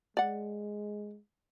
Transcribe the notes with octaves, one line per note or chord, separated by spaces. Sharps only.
G#3 D5 F#5